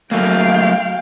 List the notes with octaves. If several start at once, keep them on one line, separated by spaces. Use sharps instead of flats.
F#3 A3 A#3 F5 G5